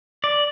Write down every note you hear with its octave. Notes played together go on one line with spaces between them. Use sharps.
D5